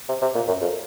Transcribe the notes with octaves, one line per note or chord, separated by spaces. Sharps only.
C3
C3
A#2
F#2
F2